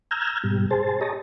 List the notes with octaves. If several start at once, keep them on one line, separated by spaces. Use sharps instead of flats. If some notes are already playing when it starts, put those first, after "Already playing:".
A#5 E6 F6 G6 G#6
G#2 B2 G3
G#4 C5 A5
G4 G#4 C#5 D#5 A5 A#5